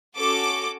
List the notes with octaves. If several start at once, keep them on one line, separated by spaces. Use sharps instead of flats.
C#4 F#4 A4 D6